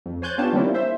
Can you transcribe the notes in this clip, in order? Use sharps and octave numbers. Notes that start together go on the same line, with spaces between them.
F2
C5 C#5 G#5 F#6 G6 A6
B3 D4 F4 G4 C#5 A5
D#3 G3 A#3 C4 C#4 E4
C5 E5